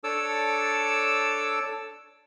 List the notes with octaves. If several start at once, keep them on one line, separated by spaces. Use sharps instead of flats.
D4 A4 C#5 A5 D6 E6